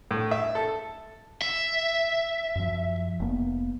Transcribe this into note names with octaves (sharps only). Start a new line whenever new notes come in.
A2
E5
A4
E5
F#2 F3
F1 A#3 B3